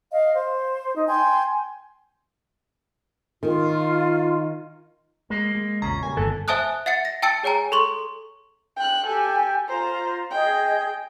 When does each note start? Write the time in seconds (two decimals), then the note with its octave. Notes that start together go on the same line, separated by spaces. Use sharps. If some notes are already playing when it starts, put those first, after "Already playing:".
0.11 D#5 F5
0.34 C5
0.96 D#4
1.08 G5 G#5 C6 G6
3.43 D#3 F4
5.30 G#3 A#3
5.55 G#3
5.82 B1 E2 A#2 C#3 A#5
6.03 B2 G3 A#3 G#5
6.17 G1 E3 B3 A4
6.48 C5 E5 G#5 A5 D#6 F#6
6.86 E5 F#5 A6 C#7
7.05 A#6
7.22 G5 A5 E6 A6 C#7
7.43 G#4 C#5 G5 G#5 A#5
7.72 A4 C6 C#6 F#7
8.77 G5 F#6
9.07 G4 A4 G#5
9.68 F4 C5 A#5
10.31 G#4 D#5 G5